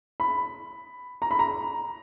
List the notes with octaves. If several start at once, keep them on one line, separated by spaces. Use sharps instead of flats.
B5
A#5
B5
A#5